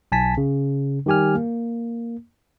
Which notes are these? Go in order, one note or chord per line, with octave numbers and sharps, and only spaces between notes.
B1 G#5 A5 B6
C#3
D#3 G3 G4 G#5 F6
A#3